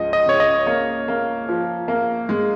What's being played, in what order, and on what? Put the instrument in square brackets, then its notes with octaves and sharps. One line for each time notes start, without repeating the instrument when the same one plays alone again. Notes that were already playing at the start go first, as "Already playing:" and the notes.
Already playing: [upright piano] C#2 F3 [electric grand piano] D#5
[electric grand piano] D#5
[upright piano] C#3 [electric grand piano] C#5
[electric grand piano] D#5
[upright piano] A#3 [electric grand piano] C#5
[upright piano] A#3
F3
A#3
G#3